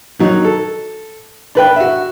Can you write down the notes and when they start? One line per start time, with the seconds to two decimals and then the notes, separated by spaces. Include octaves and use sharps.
0.19 D#3 F#3 D#4
0.44 A4
1.55 D4 B4 G5
1.76 F#4 E5